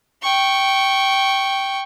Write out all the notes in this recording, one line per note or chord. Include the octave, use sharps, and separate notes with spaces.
G5 C#6